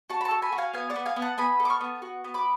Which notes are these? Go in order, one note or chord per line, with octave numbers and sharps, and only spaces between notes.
F#4 A5 C#6
B5
A5 C#6
A4
G#5 B5
F#4
F5 G#5
B3 F5 G#5
D5 F#5
B3
F5 G#5
B3
F#5 A5
B3 G#5 B5
A4
D6
C#6 F6
B3
F#4
B3
B5 D6